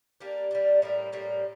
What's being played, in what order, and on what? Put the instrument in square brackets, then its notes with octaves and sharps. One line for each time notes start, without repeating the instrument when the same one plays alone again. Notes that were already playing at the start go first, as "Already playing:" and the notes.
[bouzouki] G3 A#3 D4
G3 A#3 D4
A2 G3 A#3
A2 G3 A#3